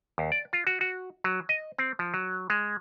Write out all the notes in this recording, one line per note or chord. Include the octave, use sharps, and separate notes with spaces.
D#2
D5
F4
F#4
F#4
F#3
D#5
C4
F3
F#3
G#3